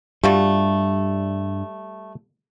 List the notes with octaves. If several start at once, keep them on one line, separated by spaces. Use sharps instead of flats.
G2 G3 A3 F4 F#4